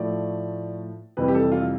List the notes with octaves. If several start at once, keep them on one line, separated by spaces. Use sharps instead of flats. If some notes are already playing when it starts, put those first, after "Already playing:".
Already playing: A2 F3 A3 D5
F2 C3 E3 G3 B4
G4
A4
F4